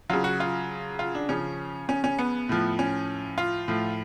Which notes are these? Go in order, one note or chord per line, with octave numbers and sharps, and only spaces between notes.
C#3 F#3 F4
F#4
F4
F4
D4
C#3 F3 C#4
C#4
C#4
B3
A2 F3
C#4
F4
A2 F3